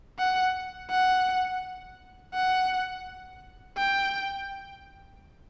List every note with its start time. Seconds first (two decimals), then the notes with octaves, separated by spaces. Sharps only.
0.19 F#5
0.91 F#5
2.34 F#5
3.77 G5